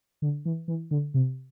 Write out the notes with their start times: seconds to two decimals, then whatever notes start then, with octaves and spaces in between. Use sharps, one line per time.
0.22 D3
0.45 E3
0.68 E3
0.91 D3
1.14 C3